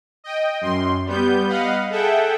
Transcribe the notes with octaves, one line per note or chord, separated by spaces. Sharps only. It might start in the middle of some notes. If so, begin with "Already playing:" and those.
D#5 G5
F#2 C6
G3 B3 G6
D#5 F5 F#5 B5
G#4 A4 E5 F#5 G5